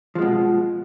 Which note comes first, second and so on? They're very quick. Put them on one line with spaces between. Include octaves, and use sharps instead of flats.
F3 G#3 B2